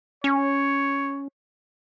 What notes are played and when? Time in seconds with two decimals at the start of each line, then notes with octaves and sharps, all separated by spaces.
0.24 C#4 C#5